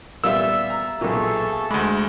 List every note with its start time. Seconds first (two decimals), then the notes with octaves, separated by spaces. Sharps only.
0.24 A#2 G3 B3 F4 E5 E6
0.70 A#5
1.01 B1 A#2 G#4 A4 C#6
1.71 D2 G#3 B5 C#6